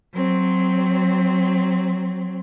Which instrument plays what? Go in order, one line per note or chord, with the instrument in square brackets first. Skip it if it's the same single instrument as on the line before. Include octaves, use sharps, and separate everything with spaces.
[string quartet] F#3 C4